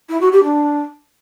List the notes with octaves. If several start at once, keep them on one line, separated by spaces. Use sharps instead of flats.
E4
F#4
G4
D4